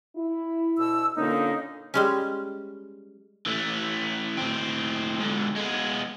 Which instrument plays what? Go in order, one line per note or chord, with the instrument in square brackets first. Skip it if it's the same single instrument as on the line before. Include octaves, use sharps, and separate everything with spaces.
[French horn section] E4
[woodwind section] D2 B2 E6
[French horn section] A#2 D3 A#3 [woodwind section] C#4 D#4
[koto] G3 G#3 C#4
[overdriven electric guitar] E3 A3
A2 C4
G#2 D3
G#3 B3